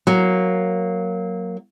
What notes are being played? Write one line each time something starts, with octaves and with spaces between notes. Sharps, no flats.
F#3 A#3